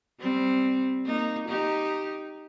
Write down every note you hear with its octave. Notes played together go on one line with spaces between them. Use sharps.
G3 C4
A#3 D#4
D#4 G4